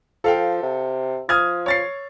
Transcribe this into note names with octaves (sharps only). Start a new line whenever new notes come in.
F3 A4 F5 G5
C3
F3 D#6 F6 G#6
C#5 A6 C7